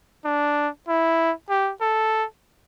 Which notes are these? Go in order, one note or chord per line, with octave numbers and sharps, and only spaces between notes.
D4
E4
G4
A4